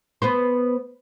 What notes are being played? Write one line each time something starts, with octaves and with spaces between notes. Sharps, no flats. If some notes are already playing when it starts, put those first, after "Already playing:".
B3 B4 C5